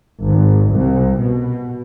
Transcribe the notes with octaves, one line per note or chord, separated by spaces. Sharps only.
G#1
C2
B2